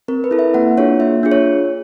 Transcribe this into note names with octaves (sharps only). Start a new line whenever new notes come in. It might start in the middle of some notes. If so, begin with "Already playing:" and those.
C4 A#4
B4
E4 A4
E5
A#3 F#5
D4 F4 G#4 C#5
A#3 E5
D4 F4 G#4
C#5